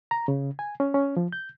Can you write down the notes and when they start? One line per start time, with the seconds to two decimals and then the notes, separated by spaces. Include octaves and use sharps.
0.11 A#5
0.28 C#3
0.59 G#5
0.80 C#4
0.94 C#4
1.17 F3
1.33 G6